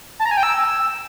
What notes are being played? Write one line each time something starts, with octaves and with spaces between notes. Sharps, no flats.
A5
A#5
G#5
G5
E6